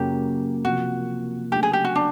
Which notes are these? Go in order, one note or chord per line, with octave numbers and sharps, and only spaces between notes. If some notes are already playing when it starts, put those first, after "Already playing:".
Already playing: F#2 C#3 F#3 A#3 G4
C3 F3 A#3 F#4
C#3 F#3 A3 D4 G4
G#4
G4
F#4
D4